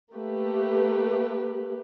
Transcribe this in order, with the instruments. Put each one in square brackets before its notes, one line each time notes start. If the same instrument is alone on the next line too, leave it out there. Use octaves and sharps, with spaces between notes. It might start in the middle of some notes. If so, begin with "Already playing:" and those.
[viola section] A3 A#3 G4 B4